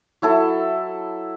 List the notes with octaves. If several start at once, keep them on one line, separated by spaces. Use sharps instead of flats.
F#3 E4 A4